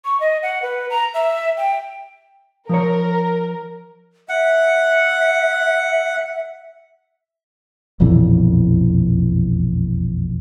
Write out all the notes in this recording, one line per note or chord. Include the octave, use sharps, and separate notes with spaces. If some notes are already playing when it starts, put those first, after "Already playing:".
C#6
D#5
F#5
B4
A#5
E5
G5
F3 A#4 C5 C#5
E5 F#5
E1 A#1 F2 E3